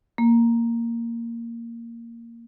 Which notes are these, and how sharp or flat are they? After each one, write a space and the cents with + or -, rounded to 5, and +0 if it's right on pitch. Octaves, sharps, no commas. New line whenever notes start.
A#3 -5